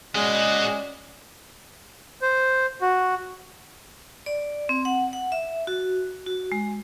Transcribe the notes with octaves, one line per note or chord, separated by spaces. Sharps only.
G#3 C#4 F#4 D5 D#5
C5
F#4
D5
C4
F#5
F#5
E5
F#4
F#4
G#3